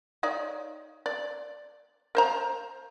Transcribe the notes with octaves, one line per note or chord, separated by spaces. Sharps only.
D#4 C#5 D5
D5
A#4 C5 A#5